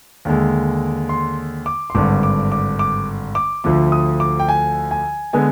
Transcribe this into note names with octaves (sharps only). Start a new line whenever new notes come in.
D#2 D3 G#3
C6
D6
C6
G#1 G2 D3 D6
D6
D6
D6
D6
D2 D3 F3 D6
D#6
D6
G5
G#5
G#5
D3 G#3 B3 G#5